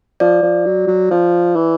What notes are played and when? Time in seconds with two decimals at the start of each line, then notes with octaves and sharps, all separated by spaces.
0.20 F3 D5
0.43 F3
0.66 F#3
0.87 F#3
1.11 F3
1.56 E3